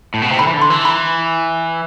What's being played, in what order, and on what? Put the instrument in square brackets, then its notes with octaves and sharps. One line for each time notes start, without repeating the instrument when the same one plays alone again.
[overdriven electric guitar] A2
B2
C3
[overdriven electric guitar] D3 [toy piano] B5
[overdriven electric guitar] E3
D3
[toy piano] C6
[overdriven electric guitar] E3
[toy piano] B5